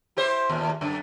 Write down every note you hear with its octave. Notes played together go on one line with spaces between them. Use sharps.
E4 G4 C5
D#2 A#2
F#2 D3 D4